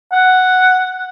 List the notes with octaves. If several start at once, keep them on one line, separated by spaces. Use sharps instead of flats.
F#5